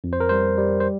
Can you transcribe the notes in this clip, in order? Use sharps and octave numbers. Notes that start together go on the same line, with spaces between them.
F2
C5
A#4
G3 C5
G3
C5